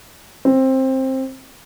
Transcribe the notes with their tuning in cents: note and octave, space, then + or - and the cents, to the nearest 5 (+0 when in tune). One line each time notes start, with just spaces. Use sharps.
C4 +15